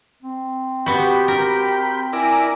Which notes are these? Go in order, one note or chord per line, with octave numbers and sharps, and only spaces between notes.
C4
B3 F#4 G4 G5 B5
A#4
E4 A#4 D5 G#5